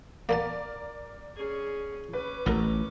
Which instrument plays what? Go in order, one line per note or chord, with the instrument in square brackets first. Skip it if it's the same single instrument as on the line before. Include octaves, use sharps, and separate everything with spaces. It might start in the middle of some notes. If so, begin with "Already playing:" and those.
[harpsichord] A#3 B3 A5 [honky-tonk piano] A#4 D5
[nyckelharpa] C#4 G#4
[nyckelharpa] C#4 D6 [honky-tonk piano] B4
[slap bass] A1 [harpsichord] B3 A#4